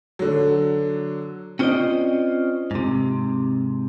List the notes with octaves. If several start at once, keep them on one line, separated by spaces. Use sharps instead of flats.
D3 F#3
C4 C#4 F4 C5 D5 D#5
G#2 C3